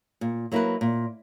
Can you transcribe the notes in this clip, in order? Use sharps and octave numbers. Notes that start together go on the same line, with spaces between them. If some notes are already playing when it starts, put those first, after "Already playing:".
A#2
F#3 A#3 E4 B4
A#2